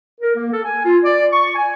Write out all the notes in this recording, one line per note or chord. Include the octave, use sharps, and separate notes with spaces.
A#4
A#3
A4
G#5
F4
D5
C#6
G#5